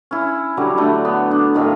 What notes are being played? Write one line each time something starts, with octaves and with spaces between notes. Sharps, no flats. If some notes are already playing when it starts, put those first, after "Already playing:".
C#4 E4
D3 F#3 G3 A#5
D3 A3
B3
D4
A2 D#3 A3 F5